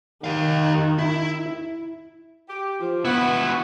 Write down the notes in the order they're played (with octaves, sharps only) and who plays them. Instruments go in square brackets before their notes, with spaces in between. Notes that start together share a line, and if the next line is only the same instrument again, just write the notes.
[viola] D#3 [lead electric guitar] G4 F5
[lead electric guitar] E4
[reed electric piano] E4
[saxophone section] G4
F3
[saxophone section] B3 [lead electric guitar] E4 F#4